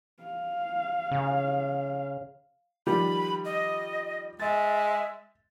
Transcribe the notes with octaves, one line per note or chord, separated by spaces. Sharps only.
F5
C#3
D#3 F3 G3 B5
D#5
G#3 E5 A6